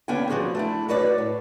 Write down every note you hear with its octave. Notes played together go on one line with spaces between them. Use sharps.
D3 A#3 B3 C#4 G5 G#5
F3 B3 F#4 G#4 C5
A3 D4 E4
D#4 F#4 B4 C#5 D5
A2